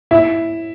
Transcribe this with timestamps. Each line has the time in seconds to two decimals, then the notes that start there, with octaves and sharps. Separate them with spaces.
0.11 E4